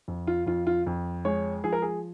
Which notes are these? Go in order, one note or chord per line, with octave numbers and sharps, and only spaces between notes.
F2
F4
F2 F4
F4
F2
G#3 C#5
F3 G#4
A#4
G#4